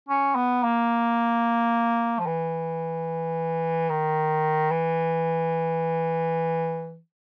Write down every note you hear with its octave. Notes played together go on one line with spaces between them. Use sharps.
C#4
B3
A#3
F3
E3
D#3
E3